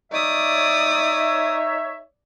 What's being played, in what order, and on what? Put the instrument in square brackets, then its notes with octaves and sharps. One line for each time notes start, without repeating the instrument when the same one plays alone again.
[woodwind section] D#4 C#5 E5 [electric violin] D5 D#6